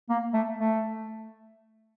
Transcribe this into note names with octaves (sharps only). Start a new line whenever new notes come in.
A#3
A3
A3